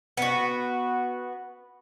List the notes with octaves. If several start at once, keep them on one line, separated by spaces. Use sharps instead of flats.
B3 F#4